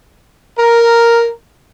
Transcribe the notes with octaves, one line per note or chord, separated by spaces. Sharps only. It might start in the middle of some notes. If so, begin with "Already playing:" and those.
A#4